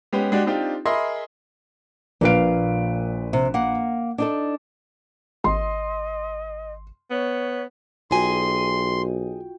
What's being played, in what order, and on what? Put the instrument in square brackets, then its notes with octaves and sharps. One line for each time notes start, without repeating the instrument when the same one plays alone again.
[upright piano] G#3 B3 C#4 G4
G#3 D4 F#4 G4 D5
C4 D4 D#4 F4 G4
G#4 A#4 D#5 E5 B5 C6
[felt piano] A#1 B4 D7 [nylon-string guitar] A#2 F4 F5
[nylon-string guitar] C3
A#3 F#5
D4 D#4 A4
[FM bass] G#1 [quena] D#5 [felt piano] C6
[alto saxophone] B3 [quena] C#5
[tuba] B1 [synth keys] F4 F#4 G5 [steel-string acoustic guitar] G#4 D#5 G#5 [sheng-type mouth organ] C6